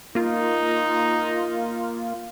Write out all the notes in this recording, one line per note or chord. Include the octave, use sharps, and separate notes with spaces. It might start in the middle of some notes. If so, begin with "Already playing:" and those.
A#3 D#4 F4